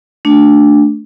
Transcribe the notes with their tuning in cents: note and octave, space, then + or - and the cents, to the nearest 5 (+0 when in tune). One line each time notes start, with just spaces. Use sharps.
A3 +0 D4 +0